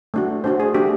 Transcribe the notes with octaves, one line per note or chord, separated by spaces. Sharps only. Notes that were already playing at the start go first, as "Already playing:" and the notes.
A3 D4 F#4
A3 D4 F#4 C5
G#4
A3 D4 F#4 G4